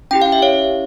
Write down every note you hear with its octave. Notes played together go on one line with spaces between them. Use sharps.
C#4 E4 G4 G5
F5
E5
C#5 F5